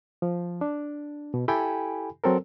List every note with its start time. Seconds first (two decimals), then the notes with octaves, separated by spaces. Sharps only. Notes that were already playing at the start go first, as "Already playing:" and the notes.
0.22 F3
0.61 D4
1.34 B2
1.48 E4 G4 A4 G5 G#5 B5
2.24 F#3 C4 A4 A#4